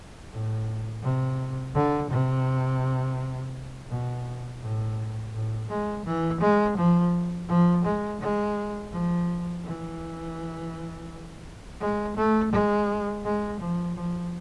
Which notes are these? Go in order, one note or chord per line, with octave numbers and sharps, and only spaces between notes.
A2
C3
D3
C3
B2
A2
A2
G#3
E3
G#3
F3
F3
G#3
G#3
F3
E3
G#3
A3
G#3
G#3
F3
F3